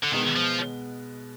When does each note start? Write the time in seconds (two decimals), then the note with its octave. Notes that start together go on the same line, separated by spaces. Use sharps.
0.03 D3
0.12 B2 D#3 G#3 B3
0.36 F3